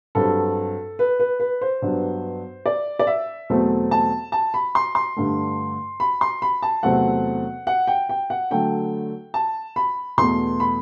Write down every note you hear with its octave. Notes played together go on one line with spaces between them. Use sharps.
G2 F#3 C4 A4
B4
B4
B4
C5
G2 F#3 B3 D4
D5
D5
E5
E2 B2 F#3 A3 C4
A5
A5
B5
C6
C6
G2 D3 A3
B5
C6
B5
A5
E2 C3 F#3 A3 C4 F#5
F#5
G5
G5
F#5
D3 F#3 A3 G5
A5
B5
E2 B2 A3 C6
B5